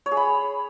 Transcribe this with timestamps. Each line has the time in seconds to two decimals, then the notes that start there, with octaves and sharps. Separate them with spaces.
0.06 C#5
0.11 G#4
0.17 B5